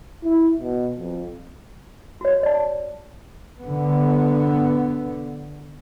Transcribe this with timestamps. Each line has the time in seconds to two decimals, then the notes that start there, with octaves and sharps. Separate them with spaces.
0.24 E4
0.61 B2
0.97 F2
2.21 F#4 C#5
2.43 D5 A5
3.61 D3 B3